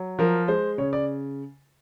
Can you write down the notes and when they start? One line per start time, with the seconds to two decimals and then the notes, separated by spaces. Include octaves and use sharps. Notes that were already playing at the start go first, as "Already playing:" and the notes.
Already playing: F#3
0.19 F3 A#4
0.48 G#3 C5
0.78 C#3 C#5
0.93 D5